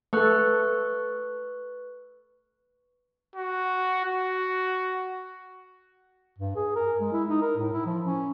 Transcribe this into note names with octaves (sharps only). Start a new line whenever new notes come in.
A3 A4 B4 C#6 F#6
F#4
F#4
G2
G#4
A#4
G#3
E4
D#4
A#4
A2
E4
F3
C#4